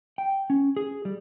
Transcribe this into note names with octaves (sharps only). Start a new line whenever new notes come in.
G5
C#4
G#4
G3